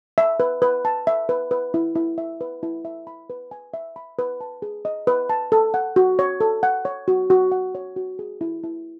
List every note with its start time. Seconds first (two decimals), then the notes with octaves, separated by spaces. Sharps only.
0.18 E5
0.40 B4
0.62 B4
0.85 A5
1.07 E5
1.29 B4
1.51 B4
1.74 E4
1.95 E4
2.18 E5
2.41 B4
2.63 E4
2.85 E5
3.07 B5
3.30 B4
3.51 G#5
3.74 E5
3.96 B5
4.19 B4
4.41 A5
4.62 G#4
4.85 D#5
5.07 B4
5.29 A5
5.52 A4
5.74 F#5
5.96 F#4
6.19 C#5
6.41 A4
6.63 F#5
6.85 C#5
7.08 F#4
7.30 F#4
7.52 F#5
7.75 C#5
7.96 F#4
8.19 G#4
8.41 E4
8.64 E4